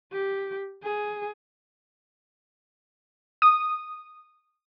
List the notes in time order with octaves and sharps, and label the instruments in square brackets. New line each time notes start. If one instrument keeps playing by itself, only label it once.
[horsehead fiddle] G4
G#4
[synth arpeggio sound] D#6